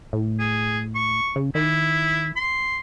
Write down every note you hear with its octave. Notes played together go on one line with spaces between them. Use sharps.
A2
G#4
C#6
C#3
D#3 E4
C6